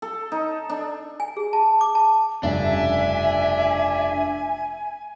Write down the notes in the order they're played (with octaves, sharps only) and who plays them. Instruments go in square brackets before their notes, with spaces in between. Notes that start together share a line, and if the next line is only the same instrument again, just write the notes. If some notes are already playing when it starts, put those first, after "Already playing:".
[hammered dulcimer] A4
D#4
D4
[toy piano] G#5
G#4
A5
D6
A5
[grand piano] F1 G2 C#3 [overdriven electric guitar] D4 [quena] E5 [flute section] G#5